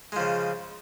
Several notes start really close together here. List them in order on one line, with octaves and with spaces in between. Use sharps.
G#3 F3 C#3